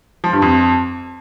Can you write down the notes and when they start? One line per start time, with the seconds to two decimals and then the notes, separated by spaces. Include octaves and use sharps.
0.24 F3
0.33 G2
0.42 F2